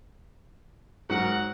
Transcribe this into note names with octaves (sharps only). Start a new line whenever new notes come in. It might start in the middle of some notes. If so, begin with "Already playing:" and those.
G#2 F#3 A#4 F#5